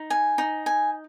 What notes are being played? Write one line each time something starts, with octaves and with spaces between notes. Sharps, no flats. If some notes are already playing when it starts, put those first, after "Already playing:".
Already playing: D#4
G#5
D#4
G#5